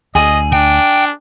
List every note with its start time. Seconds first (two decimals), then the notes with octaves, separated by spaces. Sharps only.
0.15 D2 G#4 D#5
0.53 D4 G5